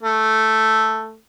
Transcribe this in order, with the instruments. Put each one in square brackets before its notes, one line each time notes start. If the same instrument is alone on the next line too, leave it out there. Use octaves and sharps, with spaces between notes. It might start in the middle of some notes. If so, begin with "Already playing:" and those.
[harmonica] A3